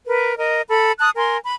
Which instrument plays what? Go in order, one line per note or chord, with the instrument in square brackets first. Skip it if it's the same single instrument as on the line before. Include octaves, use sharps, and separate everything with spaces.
[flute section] A#4 B4
A#4 D#5
A4 B5
A5 D#6 F#6
A#4 G#5 C6
B5